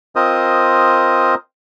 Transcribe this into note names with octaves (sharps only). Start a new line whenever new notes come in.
C4 F4 A#4 C5 D#5 D#6